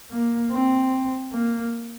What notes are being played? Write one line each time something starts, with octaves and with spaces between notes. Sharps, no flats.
A#3
C4
A#3